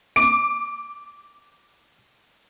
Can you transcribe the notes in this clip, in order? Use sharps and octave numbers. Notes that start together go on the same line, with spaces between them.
D6 D7